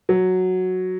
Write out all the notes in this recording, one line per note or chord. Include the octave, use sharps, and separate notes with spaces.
F#3